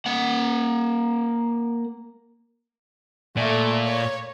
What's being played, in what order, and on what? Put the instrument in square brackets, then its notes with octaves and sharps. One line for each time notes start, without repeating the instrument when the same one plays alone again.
[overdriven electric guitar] A#3 F#5
[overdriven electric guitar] A#2 [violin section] A3
[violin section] C#5